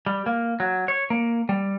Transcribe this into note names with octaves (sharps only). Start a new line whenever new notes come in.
G3
A#3
F#3
C#5
A#3
G3